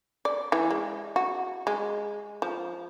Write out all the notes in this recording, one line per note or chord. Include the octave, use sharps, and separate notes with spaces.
D5
E3
G#3
F#4
G#3
F3